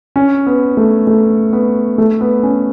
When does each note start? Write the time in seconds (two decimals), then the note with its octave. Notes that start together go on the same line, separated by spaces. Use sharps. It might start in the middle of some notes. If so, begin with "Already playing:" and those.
0.16 C#4
0.47 B3
0.77 A3
1.07 A3
1.53 B3
1.98 A3
2.21 B3
2.43 C#4